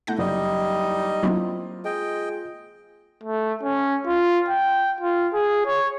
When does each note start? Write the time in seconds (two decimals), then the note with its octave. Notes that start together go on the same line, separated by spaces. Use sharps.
0.07 A3 E4 A4 F#5 G6 A#6
0.18 F#1 G3 D#4 D5 D#5
1.23 F#3 A#3 C4 D4 E4 F4
1.85 G#3 D#5 G5
3.24 A3
3.63 C#4
4.06 F4
4.49 G5
5.01 F4
5.33 G#4
5.66 C#5